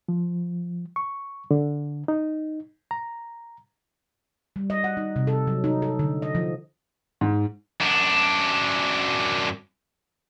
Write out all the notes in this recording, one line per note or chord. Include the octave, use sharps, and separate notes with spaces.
F3
C#6
D3
D#4
A#5
G3
D#5
F#5
D#4
C3
A4
F#3
D#4
A4
D3
D#5
F3
G#2
F#2 D4